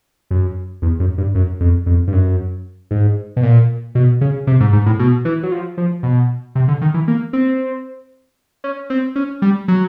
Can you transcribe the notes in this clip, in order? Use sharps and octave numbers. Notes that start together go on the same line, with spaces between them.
F#2
E2
F#2
G2
F#2
F2
F2
G2
F#2
G#2
B2
A#2
B2
C#3
C3
G#2
G#2
A2
B2
E3
F#3
F3
F3
B2
C3
D3
D#3
E3
A#3
C4
C#4
C4
C#4
G3
F#3